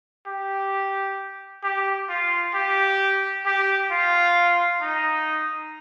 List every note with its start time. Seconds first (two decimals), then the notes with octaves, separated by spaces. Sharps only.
0.27 G4
1.64 G4
2.09 F4
2.54 G4
3.46 G4
3.91 F4
4.82 D#4